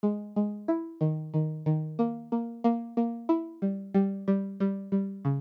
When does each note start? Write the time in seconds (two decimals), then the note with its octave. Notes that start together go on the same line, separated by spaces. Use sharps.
0.03 G#3
0.36 G#3
0.68 E4
1.01 D#3
1.34 D#3
1.66 D#3
1.99 A#3
2.32 A#3
2.64 A#3
2.97 A#3
3.29 E4
3.62 G3
3.94 G3
4.28 G3
4.60 G3
4.92 G3
5.25 C#3